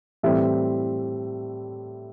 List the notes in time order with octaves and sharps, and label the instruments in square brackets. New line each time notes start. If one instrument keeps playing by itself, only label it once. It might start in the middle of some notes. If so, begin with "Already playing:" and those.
[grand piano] A2 E3 G3 C4 E5